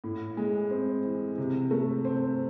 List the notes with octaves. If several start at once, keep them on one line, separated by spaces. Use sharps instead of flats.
A2
G#3
C4
E3
C3
A3
C4